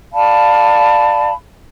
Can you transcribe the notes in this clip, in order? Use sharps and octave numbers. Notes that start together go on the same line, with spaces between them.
D5 F5 A5 B5